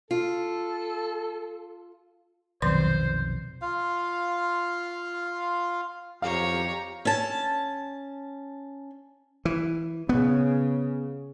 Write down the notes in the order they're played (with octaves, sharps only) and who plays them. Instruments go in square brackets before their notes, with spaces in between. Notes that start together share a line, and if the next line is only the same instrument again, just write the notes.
[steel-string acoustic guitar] F4 [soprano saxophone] A4
[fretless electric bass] B1 F2 C3 [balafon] D#3 F#3 C6 [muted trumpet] C5
[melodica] F4 F5
[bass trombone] F2 [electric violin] G4 A#5 [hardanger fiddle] C#5 [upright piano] F5
[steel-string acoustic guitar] C#4 A5
[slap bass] E3
[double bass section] C#3 [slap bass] B3